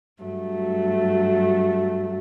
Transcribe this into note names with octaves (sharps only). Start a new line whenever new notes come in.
G2 F#3 A3